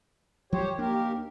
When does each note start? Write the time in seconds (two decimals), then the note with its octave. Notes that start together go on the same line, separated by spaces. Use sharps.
0.52 F3 F#3 G4 C5 C#5
0.78 D#2 A#3 D4 G4 A#4